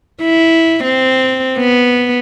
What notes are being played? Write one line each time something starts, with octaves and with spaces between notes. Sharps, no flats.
E4
C4
B3